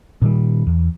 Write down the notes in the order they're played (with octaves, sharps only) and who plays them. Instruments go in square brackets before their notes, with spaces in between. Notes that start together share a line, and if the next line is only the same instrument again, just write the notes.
[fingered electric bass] A#2 D#3 G3
E2